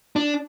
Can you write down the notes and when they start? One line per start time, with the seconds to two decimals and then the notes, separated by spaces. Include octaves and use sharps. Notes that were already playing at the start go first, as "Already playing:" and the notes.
0.16 D4